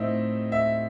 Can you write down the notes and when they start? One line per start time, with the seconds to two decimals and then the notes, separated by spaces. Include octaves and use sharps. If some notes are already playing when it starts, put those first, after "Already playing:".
Already playing: A2 A3 C4 D#4 D#5 E5
0.52 E5